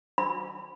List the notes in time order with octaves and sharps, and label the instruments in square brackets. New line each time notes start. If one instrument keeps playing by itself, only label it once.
[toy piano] B5